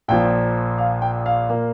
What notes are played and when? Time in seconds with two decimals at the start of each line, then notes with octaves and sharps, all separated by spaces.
0.08 A#1 A#2 F3 G5
0.78 F5
1.02 G5
1.26 F5
1.49 A#2 A#3